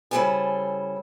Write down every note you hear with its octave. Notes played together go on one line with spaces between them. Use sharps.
C#3 G3 E4 A4 C5 G#5